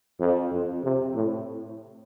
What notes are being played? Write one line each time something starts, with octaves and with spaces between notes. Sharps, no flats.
F2
F2
C3
A2